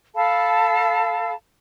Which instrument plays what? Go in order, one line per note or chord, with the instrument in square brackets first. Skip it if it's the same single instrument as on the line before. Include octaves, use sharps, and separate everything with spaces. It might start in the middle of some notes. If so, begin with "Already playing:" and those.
[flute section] A4 F5 A5 B5